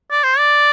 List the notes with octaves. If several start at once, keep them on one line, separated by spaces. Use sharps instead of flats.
D5
C5
D5